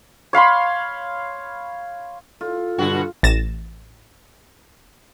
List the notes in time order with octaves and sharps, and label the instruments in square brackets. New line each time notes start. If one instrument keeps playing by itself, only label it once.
[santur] C#5 F5 B5 C6
[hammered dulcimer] F4 [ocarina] A4
[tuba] G2 [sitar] B2 D3 F#4
[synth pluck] A1 A6 A#6 E7